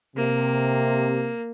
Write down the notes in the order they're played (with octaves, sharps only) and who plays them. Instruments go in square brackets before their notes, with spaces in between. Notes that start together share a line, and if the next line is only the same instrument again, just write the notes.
[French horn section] C3 [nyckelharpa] A#3